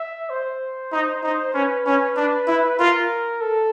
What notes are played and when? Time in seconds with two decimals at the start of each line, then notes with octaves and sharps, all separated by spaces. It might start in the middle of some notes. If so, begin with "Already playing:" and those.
Already playing: E5
0.29 C5
0.92 D#4
1.23 D#4
1.54 C#4 B4
1.86 C#4
2.16 D4
2.47 E4
2.79 F4 A#4
3.41 A4